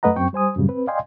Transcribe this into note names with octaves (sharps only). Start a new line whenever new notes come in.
F#2 A3 B4 D#5 F#5 A#5
F#2 C4 G5 C#6
G3 C5 G#5 D#6
F#2 A2 C#3 G3
C4 B4
D5 D#5 F5 G5 G#5 C6